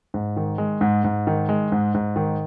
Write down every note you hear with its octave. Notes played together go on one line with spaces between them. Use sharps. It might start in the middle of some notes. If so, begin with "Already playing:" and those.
G#2
D#3
G#3
G#2
G#2
D#3
G#3
G#2
G#2
D#3